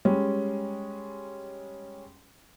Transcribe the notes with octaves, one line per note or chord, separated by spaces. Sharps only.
G3 G#3 C#4